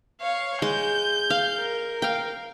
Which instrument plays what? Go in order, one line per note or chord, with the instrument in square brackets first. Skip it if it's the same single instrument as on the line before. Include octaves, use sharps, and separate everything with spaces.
[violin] C#5 F5
[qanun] G#3 [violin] G6
[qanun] F5
[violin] A#4
[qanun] F5 G5